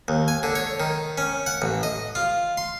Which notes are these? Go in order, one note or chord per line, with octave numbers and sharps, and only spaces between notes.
D#2
G#5
D3
C#5
D#3
C#4
F#5
A1
D#5
F4
C6